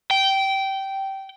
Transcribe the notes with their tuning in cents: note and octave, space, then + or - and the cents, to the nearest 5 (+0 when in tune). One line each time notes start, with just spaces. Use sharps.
G5 -15